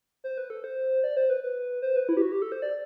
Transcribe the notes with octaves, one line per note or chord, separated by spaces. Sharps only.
C5
B4
A4
C5
D5
C5
B4
B4
C5
B4
E4
G4
F#4
G4
A4
C5
D5